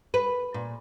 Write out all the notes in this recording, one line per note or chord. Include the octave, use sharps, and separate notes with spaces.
B4
A#2